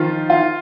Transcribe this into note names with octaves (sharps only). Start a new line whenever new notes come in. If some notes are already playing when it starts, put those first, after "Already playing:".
Already playing: D#3 F3 F4
F4